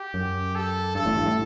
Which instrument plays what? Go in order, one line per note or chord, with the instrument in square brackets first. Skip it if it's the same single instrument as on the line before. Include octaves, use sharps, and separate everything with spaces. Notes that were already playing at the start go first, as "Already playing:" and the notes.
Already playing: [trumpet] G4
[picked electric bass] F#2
[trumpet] A4
[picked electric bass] G2 [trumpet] A4
[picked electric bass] A1 A2
G2
A2